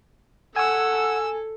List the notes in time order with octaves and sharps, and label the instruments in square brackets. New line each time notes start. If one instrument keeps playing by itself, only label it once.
[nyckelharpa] A4 [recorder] F#5 [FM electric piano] G#5 [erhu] E6